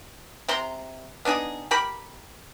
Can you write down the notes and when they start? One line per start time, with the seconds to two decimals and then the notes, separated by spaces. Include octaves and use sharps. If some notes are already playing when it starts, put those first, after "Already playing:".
0.48 C3 A#5 C6
1.25 B3 D4 D#4 G#4
1.71 G4 A#4 B5